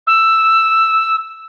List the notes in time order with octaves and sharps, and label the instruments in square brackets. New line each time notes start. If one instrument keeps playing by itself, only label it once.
[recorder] E6